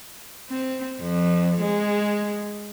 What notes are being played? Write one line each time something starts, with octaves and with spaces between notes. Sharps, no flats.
C4
F2
G#3